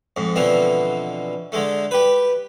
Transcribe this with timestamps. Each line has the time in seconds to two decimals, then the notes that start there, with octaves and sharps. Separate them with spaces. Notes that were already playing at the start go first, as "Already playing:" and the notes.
0.17 F2 G#2
0.36 B2 D3 E3 F3 C4
1.52 D3 G#3 A3
1.91 G4 B4